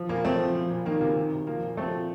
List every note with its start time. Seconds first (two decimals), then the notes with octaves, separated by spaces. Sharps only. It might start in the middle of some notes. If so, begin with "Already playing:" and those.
Already playing: F3
0.09 A#2 A#3
0.24 F3 A3 C4
0.39 F3
0.55 F3
0.70 A#2
0.85 D#3 A#3
1.00 C3 A#3
1.17 D#3
1.32 C3
1.47 F3 A#3
1.63 A#2
1.77 F3 A3 C4
1.93 A#2